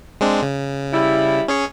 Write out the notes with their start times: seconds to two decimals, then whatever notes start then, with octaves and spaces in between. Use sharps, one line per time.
0.21 G#3 C4 D4
0.42 C#3
0.92 G3 E4
1.48 C#4 G#4 C#5